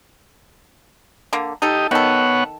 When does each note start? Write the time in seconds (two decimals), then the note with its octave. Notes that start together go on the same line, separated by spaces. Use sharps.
1.33 D3 A#3
1.62 D#4 G4 A4 D#5
1.91 D#3 B3 A4 C#5 F#5